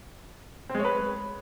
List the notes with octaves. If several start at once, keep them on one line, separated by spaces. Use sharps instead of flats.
C4
G#3
C#5
B4